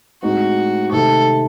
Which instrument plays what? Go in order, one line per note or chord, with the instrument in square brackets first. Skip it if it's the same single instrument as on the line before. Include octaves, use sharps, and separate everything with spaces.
[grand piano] A2 G#3 C4 D#4 [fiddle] F#4
[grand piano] C3 D#3 A3 C4 D#4 [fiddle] A4